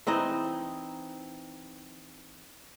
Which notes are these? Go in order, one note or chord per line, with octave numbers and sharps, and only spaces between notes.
E3 C4 D#4 D#5